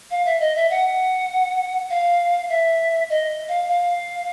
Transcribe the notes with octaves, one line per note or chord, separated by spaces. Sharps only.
F5
E5
D#5
E5
F#5
F5
E5
D#5
F5
F5